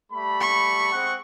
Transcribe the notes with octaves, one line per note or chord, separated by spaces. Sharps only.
G3 A3 B5
C#6
G#3 C4 F#5